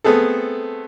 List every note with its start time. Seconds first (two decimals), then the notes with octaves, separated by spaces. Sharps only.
0.04 A3 B3 C4 G#4 A4